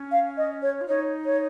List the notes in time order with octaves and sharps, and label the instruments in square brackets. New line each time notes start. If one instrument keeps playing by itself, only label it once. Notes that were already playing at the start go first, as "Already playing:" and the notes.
Already playing: [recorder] C#4
[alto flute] F5
D#5
C#5
[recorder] F4
[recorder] D#4 [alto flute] C#5
[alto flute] C#5